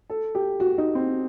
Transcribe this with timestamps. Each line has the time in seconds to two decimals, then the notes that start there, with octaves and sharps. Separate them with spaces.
0.10 A4
0.35 G4
0.60 F#4
0.78 D#4
0.95 C4